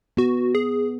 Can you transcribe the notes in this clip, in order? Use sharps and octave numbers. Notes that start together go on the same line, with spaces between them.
B3 F#4
G#4